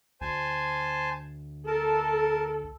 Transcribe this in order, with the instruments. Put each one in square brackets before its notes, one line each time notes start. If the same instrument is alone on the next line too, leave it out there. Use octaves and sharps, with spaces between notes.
[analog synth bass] D2 [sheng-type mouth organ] C5 G#5 A5
[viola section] A4 [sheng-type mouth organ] A#4 A5